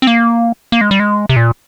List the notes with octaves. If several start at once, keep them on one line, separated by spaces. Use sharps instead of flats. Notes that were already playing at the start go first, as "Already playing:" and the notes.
C4
A#3
A#3
G#3
G3
G#3
C3
A#2